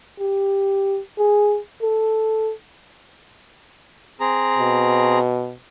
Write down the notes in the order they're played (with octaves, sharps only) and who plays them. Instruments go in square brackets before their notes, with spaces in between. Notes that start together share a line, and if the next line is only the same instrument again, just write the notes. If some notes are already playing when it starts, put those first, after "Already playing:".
[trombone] G4
G#4
A4
[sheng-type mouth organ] C4 G#4 A#5
[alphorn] B2